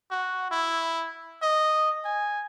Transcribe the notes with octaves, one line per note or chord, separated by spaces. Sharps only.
F#4
E4
D#5
G#5